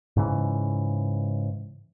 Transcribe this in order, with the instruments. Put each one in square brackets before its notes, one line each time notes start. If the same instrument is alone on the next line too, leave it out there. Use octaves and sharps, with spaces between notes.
[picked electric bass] G#2 C#3 E3